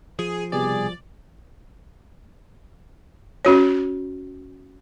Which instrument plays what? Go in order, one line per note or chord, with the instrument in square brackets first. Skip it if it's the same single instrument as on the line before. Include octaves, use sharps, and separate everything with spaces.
[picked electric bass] F3 [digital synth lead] G#4
[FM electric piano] C2 B2 G3 [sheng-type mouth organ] G#4 [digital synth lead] D5
[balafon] C#4 F#4 C#5